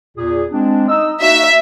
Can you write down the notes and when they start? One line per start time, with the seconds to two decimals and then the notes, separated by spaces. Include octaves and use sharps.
0.16 E2 A#2 G#4
0.52 G#3 C4 D4
0.88 D#4 D#5 E6
1.22 A#3 D#4 F#4 E5